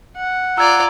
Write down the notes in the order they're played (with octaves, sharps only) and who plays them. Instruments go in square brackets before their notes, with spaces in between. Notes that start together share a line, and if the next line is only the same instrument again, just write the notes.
[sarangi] F#5
[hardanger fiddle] F4 D5 [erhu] A#5 [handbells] E6 G#6